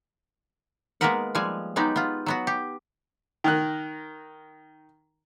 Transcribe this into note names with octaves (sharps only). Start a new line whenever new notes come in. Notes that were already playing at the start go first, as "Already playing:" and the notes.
G#3 A#3 B3 A#4 B4 F#5
F3 G3 G#3 G#5
F#3 G#3 B3 D#4 G4
B3 F4
F#3 B3 F#4
G4
D#3 A#4 F#6